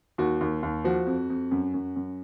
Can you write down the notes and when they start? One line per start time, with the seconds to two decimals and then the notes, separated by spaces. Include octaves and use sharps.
0.18 D#2 F#4
0.41 D#2
0.63 D#2
0.84 F3 F#4
1.06 F2
1.30 F2
1.51 F#2
1.74 F#2
1.96 F#2